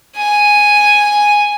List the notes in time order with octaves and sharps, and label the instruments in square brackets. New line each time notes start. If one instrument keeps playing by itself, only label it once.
[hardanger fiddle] G#5